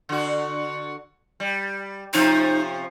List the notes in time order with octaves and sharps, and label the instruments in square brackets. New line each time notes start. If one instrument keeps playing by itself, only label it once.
[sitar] D3 F#4
G3
[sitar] C3 F3 C#4 [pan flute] D#4